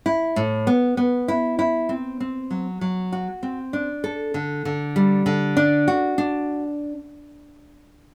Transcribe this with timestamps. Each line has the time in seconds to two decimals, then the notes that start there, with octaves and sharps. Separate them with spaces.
0.06 E4
0.36 A2
0.67 B3
0.97 B3
1.28 E4
1.59 E4
1.89 C4
2.20 C4
2.50 F#3
2.81 F#3
3.12 F#4
3.43 C4
3.73 D4
4.04 A4
4.34 D3
4.65 D3
4.96 G3
5.26 D3
5.57 D4
5.88 F#4
6.18 D4